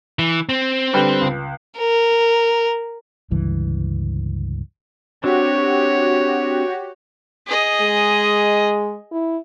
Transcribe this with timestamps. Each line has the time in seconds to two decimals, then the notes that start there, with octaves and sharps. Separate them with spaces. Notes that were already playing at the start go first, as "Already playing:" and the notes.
0.19 E3
0.49 C4
0.93 D3 G3 B4
1.21 C#2
1.78 A#4
3.31 G1 C#2 G2 E3
5.24 C4 D4 F#4 G4 C#5
7.47 G#4 D#5
7.81 G#3
9.12 E4